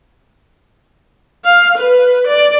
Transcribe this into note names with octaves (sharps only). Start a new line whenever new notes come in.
F5
B4
D5